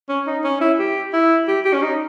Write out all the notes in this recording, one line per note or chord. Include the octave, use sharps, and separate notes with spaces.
C#4
D#4
C#4
E4
G4
E4
G4
G4
C#4
D#4